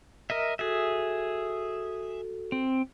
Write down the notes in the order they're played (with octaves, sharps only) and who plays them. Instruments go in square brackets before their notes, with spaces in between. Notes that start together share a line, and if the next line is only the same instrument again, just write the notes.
[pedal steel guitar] A#4 D#5 E5
[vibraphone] F#4 A4 [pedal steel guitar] G#4 E5
[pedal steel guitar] C4